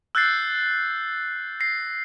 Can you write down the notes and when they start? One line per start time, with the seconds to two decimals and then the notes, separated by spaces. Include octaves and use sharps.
0.15 E6 F#6 G6 A6 C7
1.60 A#6 C7